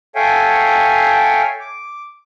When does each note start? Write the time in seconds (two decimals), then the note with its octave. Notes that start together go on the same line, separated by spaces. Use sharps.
0.15 A4 C#5 E5 F5 G5 G#5
1.60 D6